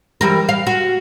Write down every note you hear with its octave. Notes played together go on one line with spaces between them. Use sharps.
E3 G3 A#4
F5
F#4